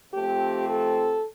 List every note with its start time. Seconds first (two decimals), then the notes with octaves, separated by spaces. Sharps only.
0.13 C3 F3 A3 C4 G4
0.68 A4